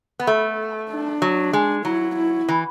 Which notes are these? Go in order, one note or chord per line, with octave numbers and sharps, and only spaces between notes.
B3
A3
D4
F#3
G#3
F#3 E4
E4
E3